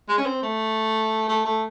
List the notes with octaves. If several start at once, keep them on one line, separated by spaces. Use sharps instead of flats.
G#3
C#4
C4
A3
A3
A3